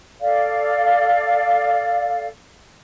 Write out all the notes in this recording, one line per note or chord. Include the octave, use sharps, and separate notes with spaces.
A4 D5 F5